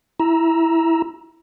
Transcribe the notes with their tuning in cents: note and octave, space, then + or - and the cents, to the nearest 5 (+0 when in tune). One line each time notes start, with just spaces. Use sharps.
E4 +0 A#5 +20 E6 +0